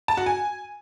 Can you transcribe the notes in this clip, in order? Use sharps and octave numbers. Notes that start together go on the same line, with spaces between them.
A5
F#4
G#5